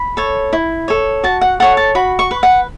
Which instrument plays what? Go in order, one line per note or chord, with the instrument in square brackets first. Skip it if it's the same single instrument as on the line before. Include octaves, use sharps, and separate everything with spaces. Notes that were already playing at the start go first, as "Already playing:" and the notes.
Already playing: [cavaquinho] B5
A4 C#5
E4
A4 C#5
F#4 A5
F#5
A4 C#5 F#5
A5
F#4 B5
C#6
B4
F#5